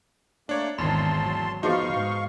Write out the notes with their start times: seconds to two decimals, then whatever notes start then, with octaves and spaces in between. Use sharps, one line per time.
0.49 A3 A#3 D4 C#5 D5
0.78 G#1 E2 D#3 A5 B5 C6
1.21 F#3
1.63 F3 B3 D#4 F#4 G#4 D#5 F5 C#6
1.92 G#2